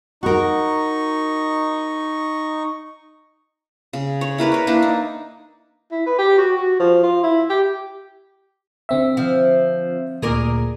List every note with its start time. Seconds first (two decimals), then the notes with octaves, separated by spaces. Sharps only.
0.23 D#4 F#4 A#4 C#6
3.93 C#3
4.21 C#5
4.38 E4 A#4 B4 D5
4.52 B4 C#5
4.67 A#3 D4 E4
4.82 D#4
5.91 E4
6.06 B4
6.18 G4
6.38 F#4
6.58 F#4
6.80 F3
7.03 F4
7.23 E4
7.50 G4
8.89 D3 C4 E5
9.17 F3
10.22 D2 A#2 G#4 A#4 D5